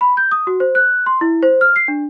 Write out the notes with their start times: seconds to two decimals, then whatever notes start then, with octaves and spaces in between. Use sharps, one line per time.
0.01 B5
0.17 G6
0.31 D#6
0.47 F#4
0.60 C5
0.75 F#6
1.06 C6
1.21 E4
1.43 C5
1.61 F6
1.76 C7
1.88 D4